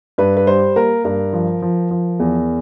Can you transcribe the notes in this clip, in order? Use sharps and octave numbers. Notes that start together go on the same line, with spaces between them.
G2 B4
B4
G3 C5
A#3 A#4
G2 A#4
F3
F3
F3
E2